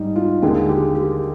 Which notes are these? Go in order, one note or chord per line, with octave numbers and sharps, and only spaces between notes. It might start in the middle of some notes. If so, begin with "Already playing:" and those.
Already playing: G#2 G3 D#4
F4
D#2 D3 G#3 G#4
G4
G4